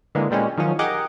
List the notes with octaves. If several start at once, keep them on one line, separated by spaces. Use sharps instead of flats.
D3 E3 G#3 A#3
A#2 G3 G#3 C#4
D#3 F3 F#3 C#4
G4 G#4 A#4 D#5 F#5 D6